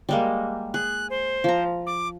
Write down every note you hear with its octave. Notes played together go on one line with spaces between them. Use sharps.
G3 G#3 A#3
G#4 F#6
C5
F3 A#5
D6